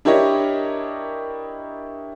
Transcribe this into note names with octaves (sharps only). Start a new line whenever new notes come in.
D4 E4 G4 A#4 C#5 D#5